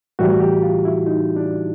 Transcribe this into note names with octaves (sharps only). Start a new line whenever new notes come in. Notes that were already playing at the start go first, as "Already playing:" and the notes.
A2 E3 G3 F#4
G4
F4
E4
D#4
D4